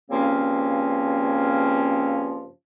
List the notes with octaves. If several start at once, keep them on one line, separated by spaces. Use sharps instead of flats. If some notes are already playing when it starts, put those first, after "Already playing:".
G2 C#3 F3 A#3 C4 C#4